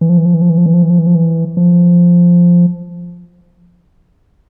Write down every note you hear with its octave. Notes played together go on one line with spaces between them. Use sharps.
E3
F3
E3
F3
E3
F3
E3
F3
E3
F3
E3
F3
E3
F3
E3
F3